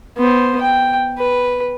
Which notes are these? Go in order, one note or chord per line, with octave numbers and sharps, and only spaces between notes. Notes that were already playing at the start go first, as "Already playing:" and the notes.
B3 C5
G5
B4